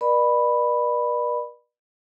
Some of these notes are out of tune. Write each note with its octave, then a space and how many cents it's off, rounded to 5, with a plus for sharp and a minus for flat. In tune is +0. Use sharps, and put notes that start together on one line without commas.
B4 -45 D5 +35 B5 +0